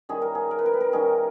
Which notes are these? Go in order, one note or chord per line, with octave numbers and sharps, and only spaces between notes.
D#3 G3 C#4 E4 G#4
A#4
G#4
A#4
B4
A#4
B4
A#4
D#3 G3 C#4 E4 G#4